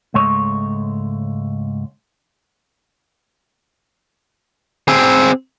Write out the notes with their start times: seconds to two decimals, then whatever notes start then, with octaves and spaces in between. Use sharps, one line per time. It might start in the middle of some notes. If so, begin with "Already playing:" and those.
0.14 C#2 G#2 G#3 A3 C#5
4.88 C4 G#4